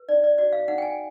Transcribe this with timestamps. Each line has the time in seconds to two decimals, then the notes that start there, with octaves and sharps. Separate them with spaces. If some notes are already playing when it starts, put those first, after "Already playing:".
Already playing: B4
0.09 D#4 D5
0.24 D5
0.38 F#4 D5
0.53 F5
0.68 D#4 F#5
0.78 G5
0.82 G#5